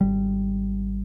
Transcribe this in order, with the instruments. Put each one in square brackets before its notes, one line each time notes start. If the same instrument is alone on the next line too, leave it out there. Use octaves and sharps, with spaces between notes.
[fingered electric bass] G#1 G3